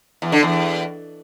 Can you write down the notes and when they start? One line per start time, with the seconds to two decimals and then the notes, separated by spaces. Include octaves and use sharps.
0.22 E2
0.32 D3
0.43 E2